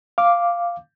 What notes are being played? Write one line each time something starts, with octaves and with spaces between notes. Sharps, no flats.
F5 D6